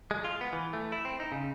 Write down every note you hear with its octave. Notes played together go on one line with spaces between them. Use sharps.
G#3
F4
B3
E3
A3
E4
C4
D#4
C#3